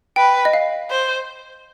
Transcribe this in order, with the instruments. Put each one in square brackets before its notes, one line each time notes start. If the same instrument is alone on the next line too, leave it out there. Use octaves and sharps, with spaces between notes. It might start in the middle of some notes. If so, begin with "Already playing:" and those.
[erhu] B4 [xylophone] G5
[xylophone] D#5
F5
[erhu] C5